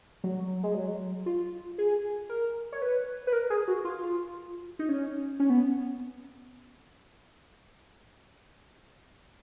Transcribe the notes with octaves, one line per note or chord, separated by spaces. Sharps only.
F#3
G#3
F#3
F4
G#4
A#4
C#5
B4
B4
A#4
G#4
F#4
F4
D#4
C#4
C#4
B3